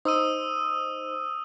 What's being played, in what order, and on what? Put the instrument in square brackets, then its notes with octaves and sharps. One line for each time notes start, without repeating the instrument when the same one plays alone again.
[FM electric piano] D#4 C5 [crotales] D#6 E6 D#7